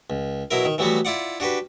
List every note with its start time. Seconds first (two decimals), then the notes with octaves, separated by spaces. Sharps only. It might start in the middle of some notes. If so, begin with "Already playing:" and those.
0.10 C#2
0.51 B2 F#3 E4 A#4
0.65 D#3
0.78 E3 F#3 G3 A3 B3 F#4
1.05 E4 F4 D5 F#5
1.40 D4 F#4 G4 B4